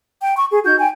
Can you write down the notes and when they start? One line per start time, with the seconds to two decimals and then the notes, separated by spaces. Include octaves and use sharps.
0.21 G5
0.37 C#6
0.51 G#4
0.64 D#4 F#4 G6
0.78 G5 G#5